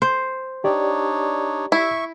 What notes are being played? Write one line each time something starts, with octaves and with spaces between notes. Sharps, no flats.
C5
D4 D#4 G4 C#5 D5
E4 E5 C#6